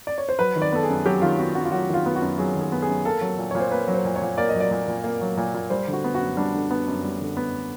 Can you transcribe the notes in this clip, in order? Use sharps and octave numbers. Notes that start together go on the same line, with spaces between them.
D5
C#5
C5
F#3 B4
D#3
D5
B3 A4
G#4
F#2
F#3 G4
D#3 F4
B3 F#4
F#2 F#4
F4
F#3 F#4
D#3 F4
B3
F#4
F#2
F#3 G#4
D#3
G#4
B3
G#4
F#2
A#3 A4
F#3
A#2
A#2 C#5
C5
A#3 B4
F#3
C5
A#2
C#5
A#2
A#3 D5
D#5
F#3
D5
A#2
A#2
A#3
F#3
A#2
A#2
G3 C5
D3
F#4
B3
F#4
F#2
G3 D4
D3
B3
F#2
G3
D3
B3